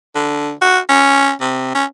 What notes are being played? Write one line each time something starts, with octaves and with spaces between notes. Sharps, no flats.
D3
F#4
C#4
C3
C#4